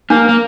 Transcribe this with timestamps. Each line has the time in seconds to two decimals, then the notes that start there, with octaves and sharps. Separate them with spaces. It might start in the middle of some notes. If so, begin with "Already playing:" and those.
0.10 A#3 D4
0.29 A#3